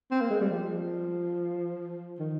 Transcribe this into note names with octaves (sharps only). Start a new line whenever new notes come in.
C4
A#3
G#3
G3
F3
D#3